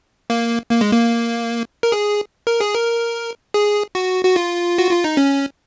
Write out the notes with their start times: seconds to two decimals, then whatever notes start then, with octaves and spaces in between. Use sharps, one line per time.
0.30 A#3
0.70 A#3
0.81 G#3
0.92 A#3
1.83 A#4
1.92 G#4
2.47 A#4
2.60 G#4
2.75 A#4
3.54 G#4
3.95 F#4
4.25 F#4
4.36 F4
4.78 F#4
4.91 F4
5.04 D#4
5.17 C#4